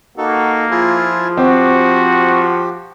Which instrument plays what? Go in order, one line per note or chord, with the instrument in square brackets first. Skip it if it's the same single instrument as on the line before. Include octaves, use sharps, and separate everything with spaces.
[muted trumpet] A#3 [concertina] D#4 A4 [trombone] F#4
[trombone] F3 [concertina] E4 F4 G#4
[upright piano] C4 [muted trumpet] F#4 [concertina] G4